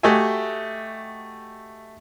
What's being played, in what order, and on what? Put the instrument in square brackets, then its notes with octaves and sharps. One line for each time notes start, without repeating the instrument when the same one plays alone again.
[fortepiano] A3 F#4 G4 D#5 E5 G#5